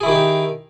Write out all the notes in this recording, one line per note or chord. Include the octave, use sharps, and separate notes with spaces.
D#3 D#4 E4 G4 G#4